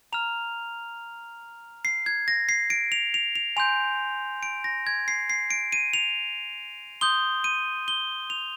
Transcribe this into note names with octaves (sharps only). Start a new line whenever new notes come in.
A#5 F6 F7
C7
G#6
A#6
C7
D7
F7
F7
F7
G#5 C6 G6 F7
D7
A#6
G#6
C7
C7
D7
D#7
F7
C6 D#6 G6 G7
D#7
G7
F7